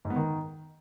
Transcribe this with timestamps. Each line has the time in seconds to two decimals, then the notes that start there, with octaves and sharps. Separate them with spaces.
0.05 G#2
0.10 B3
0.16 D#3